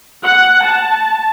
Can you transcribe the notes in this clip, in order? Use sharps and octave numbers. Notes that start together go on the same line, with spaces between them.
F#5
A5